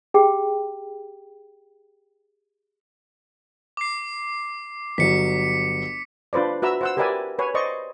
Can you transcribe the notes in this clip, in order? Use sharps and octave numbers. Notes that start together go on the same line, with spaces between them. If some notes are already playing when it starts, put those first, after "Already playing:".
G4 G#4 G5
D6 C7
G1 F#3 B6 C#7
D4 F4 B4 C5 D5
F#4 B4 E5 A#5 E6
C5 F#5 E6
G4 A#4 B4 D5 E5 G#5
B4 C#5 G#5
C5 D5 D#5 C#6